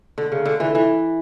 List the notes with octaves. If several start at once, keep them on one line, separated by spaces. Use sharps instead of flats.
D3
C#3
D3
E3
E3